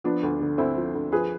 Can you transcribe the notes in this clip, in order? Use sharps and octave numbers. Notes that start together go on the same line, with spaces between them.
F3 B3 D4
D2
D3
D2 C4 E4
F3
D2
F3 G#4 B4